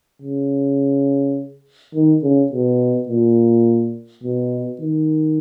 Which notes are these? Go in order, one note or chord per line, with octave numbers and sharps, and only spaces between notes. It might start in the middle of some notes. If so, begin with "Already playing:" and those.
C#3
D#3
C#3
B2
A#2
B2
D#3